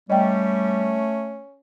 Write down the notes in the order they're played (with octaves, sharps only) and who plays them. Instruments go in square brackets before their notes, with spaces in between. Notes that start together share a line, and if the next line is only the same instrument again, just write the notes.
[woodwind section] G3 [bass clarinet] A3 [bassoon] C#4 [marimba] D#5 G5